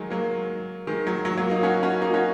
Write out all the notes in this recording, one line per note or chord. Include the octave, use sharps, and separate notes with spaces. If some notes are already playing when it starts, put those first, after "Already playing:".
Already playing: D#3 F#3 G#3
F#3 A#3
D#3 G#3
F#3
F#3
F#3 A#3
A#3 D#4
C#4 F#4
C#4 F#4
A#3 D#4
C#4 F#4